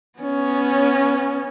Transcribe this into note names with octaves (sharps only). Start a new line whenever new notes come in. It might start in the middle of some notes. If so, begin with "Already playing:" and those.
B3 C#4